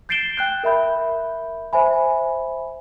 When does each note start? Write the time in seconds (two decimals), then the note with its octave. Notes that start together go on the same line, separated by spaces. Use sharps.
0.09 G6 A6 C7 D7 E7 G7
0.37 G5 F#6 G6
0.64 A#4 E5 B5 G6
1.73 C5 E5 G#5 B5